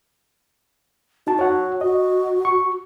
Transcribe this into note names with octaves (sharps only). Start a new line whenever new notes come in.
D#4 F#4 A5
F#4 C#5 F#5
F#4 D#5
C#6